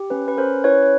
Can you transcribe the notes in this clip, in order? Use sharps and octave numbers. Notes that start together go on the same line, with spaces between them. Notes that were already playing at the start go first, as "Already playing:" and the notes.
Already playing: G4
C#4 B4
B4
C#4 A#4 C5
E4 B4 C#5
C#5